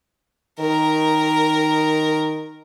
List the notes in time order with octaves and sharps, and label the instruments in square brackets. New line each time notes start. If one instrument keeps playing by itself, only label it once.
[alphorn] D#3 [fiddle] A#4